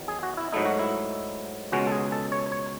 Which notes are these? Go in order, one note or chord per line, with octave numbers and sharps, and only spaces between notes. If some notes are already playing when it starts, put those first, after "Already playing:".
Already playing: E2 D#3 F#3
G#4
F#4
E4
G#2 F#3 A3 D#4 E4
F#4
E4
C#2 B2 G#3 C#4 F#4
A4
G#4
A4
C#5
C#5